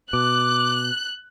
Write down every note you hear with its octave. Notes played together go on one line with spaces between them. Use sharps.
B2 D6 F#6